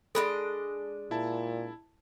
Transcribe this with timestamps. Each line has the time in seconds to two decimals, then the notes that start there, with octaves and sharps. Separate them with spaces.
0.15 G#3 D4 A4 D#5 B5
1.11 A#2 E4 A5